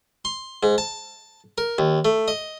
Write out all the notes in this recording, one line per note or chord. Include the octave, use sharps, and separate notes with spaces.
C6
G#2
A5
A#4
D#2
A3
D#5